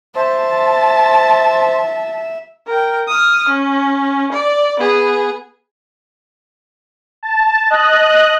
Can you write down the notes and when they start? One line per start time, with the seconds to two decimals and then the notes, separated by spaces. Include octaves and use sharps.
0.15 C5 E5 A5
2.67 A#4 G5
3.08 D#6 F6
3.48 C#4
4.32 D5
4.79 B3 G#4
7.23 A5
7.70 D#5 F#6